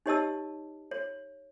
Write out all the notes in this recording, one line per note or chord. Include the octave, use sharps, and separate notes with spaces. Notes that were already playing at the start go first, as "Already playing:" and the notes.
D#4 G4 C#5 D#5 A5 E6
C#5